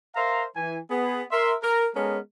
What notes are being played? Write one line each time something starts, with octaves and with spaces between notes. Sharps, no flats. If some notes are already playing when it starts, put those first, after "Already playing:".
A#4 C5 E5 F5 A#5 C6
E3 G#5
B3 G#4
A#4 E5 C6
A#4
G#3 B3 C#4 A4 A#4